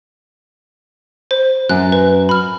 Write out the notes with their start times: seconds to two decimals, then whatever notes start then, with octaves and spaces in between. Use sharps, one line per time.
1.31 C5
1.69 F#2 F#6
1.92 B4
2.29 B5 F6